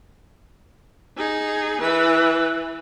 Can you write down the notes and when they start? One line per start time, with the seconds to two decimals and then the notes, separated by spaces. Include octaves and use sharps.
1.18 D#4 G#4
1.82 E3 B4